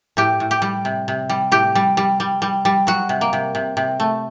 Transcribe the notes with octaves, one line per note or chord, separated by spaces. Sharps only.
A2 G4
A2
G4
G3
C3
C3
G3
A2 G4
G3
G3
G3
G3
G3
F#3 F#4
C3
A#3
C3
C3
C3
A3